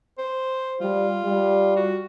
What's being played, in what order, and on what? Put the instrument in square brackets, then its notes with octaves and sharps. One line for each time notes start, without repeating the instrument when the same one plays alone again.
[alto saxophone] C5
[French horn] G3 [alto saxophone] F4
[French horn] G3
[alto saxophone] F#4